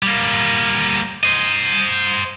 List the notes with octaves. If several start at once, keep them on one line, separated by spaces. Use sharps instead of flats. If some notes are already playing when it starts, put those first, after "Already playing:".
G3 A#3
C5 D#5